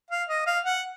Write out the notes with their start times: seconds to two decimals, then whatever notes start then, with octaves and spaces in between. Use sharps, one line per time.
0.10 F5
0.29 D#5
0.47 F5
0.65 F#5